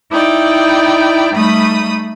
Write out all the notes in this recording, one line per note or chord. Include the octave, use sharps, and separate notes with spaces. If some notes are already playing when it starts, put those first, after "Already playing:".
D#4 E4 D5 G5
G3 A3 D#4 B5 D#6